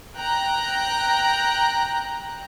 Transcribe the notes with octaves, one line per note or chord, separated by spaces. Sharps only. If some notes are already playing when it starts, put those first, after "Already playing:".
G5 A#5 F#6